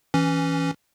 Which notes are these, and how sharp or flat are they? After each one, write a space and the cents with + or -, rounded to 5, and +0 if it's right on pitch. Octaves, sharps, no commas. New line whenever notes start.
E3 +0 C#4 +0